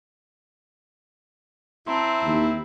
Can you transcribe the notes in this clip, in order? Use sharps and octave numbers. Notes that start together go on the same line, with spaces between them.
C4 E4 A5 A#5 C6
D#2